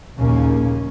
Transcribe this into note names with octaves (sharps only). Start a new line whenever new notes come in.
A#1 D#2 C#3 A#3 C#4